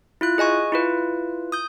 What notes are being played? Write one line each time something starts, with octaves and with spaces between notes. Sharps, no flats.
E4 F4 F#6
G#4 D#5 G#5 C#6
E4 F4 B4
D#6 G6